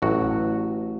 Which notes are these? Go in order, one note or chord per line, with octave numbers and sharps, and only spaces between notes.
A1 A2 F#3 F#4